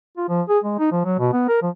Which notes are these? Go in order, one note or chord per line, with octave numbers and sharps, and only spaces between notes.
F4
F3
G#4
G#3
D#4
F3
F#3
B2
B3
A#4
F3